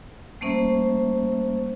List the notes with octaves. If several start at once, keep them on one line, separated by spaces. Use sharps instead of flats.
G3 A3 A#3 C#4 C5 E5